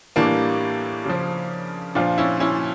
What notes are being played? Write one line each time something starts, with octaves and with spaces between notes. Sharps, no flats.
A2 E3 G3 A#3 D4
C#3 F3
A#2 F3 D4 F4
C#4 E4
C#4 E4